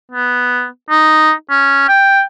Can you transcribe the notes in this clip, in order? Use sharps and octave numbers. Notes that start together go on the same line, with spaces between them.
B3
D#4
C#4
G5